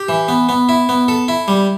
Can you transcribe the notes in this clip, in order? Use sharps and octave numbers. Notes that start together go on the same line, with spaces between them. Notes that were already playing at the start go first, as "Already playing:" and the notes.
Already playing: G4
E3
B3
B3
E4
B3
A4
E4
G3